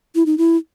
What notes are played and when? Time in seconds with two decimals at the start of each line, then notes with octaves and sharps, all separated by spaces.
0.15 E4
0.26 D#4
0.38 E4